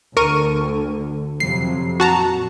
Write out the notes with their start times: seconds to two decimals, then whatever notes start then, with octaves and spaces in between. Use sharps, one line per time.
0.17 D2 D3 A#4 C#6 D#7
1.40 F2 C3 F#3 C7
2.00 A#2 F#4 A5 A#5